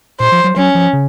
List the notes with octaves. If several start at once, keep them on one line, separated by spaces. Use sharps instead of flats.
A#2 C5
F3
F#3
F#3 C#4
F3
C#3